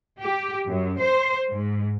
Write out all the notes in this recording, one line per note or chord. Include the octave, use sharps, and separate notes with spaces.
G4
F#2
C5
G#2